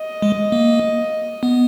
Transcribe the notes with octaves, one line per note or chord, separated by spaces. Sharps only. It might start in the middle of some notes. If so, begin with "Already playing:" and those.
Already playing: D#5
G#3
A#3
B3